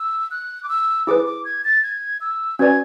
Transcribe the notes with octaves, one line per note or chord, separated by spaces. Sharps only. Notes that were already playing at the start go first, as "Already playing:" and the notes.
Already playing: E6
F#6
D6
E6
E4 G#4 B4 D6
D6
G#6
A6
G#6
E6
C#4 F#4 B4 D5 G#5 G#6